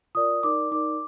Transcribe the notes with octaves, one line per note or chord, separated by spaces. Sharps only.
F4 A#4 D5 D#6
D#4 A#4 D5 D6
D#4 A#4 D5 D6